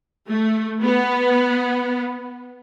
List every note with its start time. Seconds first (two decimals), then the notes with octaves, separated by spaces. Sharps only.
0.29 A3
0.83 B3